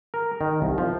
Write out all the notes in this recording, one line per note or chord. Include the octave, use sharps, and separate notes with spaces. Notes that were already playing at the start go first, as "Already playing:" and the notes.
A#4
D#3
C2
F3